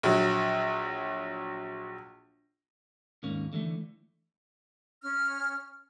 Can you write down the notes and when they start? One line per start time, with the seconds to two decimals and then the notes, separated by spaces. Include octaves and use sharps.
0.03 A#1 F#3
3.23 D#2 G#2 A#3 C#4
3.53 D3 E3 F#3 A3
5.02 C#4 F6